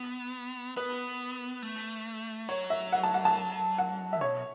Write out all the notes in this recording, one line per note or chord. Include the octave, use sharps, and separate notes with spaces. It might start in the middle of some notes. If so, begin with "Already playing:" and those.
Already playing: B3
B3 B4
A3
F#3 C#5
E5
F#5
A5
F#5
A5
F#5
E5
B2 C#5